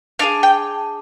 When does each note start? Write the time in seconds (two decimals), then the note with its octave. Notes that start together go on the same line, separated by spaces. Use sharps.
0.19 D4 F4 G#4 F5
0.43 G5